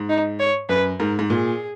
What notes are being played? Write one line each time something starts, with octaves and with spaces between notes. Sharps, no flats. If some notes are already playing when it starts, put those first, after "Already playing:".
Already playing: G#2
D#4
C#5
F#2 B4
G#2 A#4
G#2
A#2 G#4